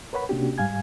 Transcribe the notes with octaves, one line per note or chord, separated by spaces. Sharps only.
A#4 B4 C#5 F#5 B5
C3 A#3 C#4 D4 F#4 G4
G#2 G3 F5 G#5 G#6